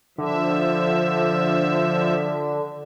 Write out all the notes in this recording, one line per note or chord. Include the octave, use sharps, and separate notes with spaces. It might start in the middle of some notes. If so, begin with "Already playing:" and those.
D3 F3 E5